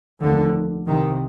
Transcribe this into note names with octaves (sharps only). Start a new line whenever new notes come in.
F1 D#2 D3
C2 C3 D#3